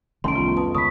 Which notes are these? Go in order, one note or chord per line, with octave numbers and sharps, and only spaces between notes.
C2 D#3 A3 C#4 C6 D7
B3 C#4 F4
F2 B4 A5 D#6
C#2 B5 C#6 D#6 B6